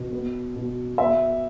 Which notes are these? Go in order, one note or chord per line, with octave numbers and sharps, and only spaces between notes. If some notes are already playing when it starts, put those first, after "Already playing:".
Already playing: B2
B3
B2
B3 E5